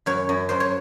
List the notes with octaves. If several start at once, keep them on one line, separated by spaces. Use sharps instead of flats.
F#2 C#5
F#2
F#2 C5
C#5